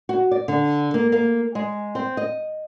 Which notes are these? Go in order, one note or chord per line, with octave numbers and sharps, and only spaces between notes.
F#4
D5
D3
A#3
A#3
G#3
C4
D#5